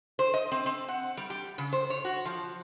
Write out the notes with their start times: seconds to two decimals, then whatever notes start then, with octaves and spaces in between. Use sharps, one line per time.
0.19 C5
0.34 D#5
0.52 C4
0.66 C4
0.88 F#5
1.17 G3
1.30 G4
1.58 C#3
1.73 C5
1.90 C#5
2.05 F#4
2.25 F3